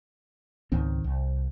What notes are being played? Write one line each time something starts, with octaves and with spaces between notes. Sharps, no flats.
C#2 G#2 D#3 C4
C2